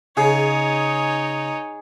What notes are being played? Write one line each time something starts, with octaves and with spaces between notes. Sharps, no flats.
C#3 D#4 G#4 C#5